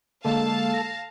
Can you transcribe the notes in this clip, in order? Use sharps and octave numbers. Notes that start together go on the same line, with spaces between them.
D3 G#3 A#3 A4 F5 A5
A#6